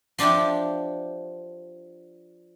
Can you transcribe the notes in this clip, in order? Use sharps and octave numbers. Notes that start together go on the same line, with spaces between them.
F3 D4 G4 E5 G5